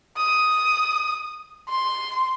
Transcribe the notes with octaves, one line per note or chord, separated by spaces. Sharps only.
D#6
C6